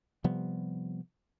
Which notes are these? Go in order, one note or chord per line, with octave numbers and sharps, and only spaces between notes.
C3 F3 G3 B3